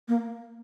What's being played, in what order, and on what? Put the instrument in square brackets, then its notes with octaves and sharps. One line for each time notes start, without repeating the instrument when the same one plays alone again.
[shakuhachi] A#3